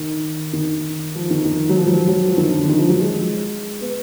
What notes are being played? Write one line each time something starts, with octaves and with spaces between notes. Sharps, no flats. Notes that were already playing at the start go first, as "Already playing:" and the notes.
Already playing: D#3
D#3
F3
D#3
D#3
F#3
F3
F#3
F3
F#3
F3
D#3
D3
D3
D#3
F3
F#3
G#3
B3